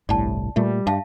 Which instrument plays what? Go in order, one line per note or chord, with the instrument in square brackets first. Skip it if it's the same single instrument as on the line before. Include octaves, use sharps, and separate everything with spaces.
[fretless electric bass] G1 A2 [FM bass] C2 [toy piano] D5 A5
[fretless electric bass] A#2 A3 [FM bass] G3
[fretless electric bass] G2 [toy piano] E5 F5 A5